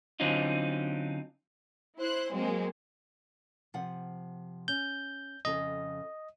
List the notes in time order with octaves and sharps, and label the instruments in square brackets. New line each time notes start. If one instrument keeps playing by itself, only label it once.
[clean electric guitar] D3 F#3 C4 C#4 D#4 F4
[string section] E4 C5 F#6
F#3 G#3 A#3 C4
[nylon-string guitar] C3 F3 F#5
[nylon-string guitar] C#4 [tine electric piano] G6
[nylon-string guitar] F2 C#3 A4 [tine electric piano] D#5